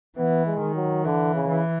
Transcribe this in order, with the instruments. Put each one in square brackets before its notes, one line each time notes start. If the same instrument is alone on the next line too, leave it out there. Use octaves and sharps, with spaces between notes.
[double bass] E3 [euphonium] B3
[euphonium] G#3
[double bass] D#3
[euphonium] F#3
[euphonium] D3 [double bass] E3
[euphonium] C#3
[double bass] E3